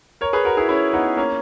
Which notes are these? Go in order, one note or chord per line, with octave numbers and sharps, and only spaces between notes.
A#4 C#5
G#4 B4
F#4 A#4
E4 G#4
C#4 E4
B3 D#4
A#3 C#4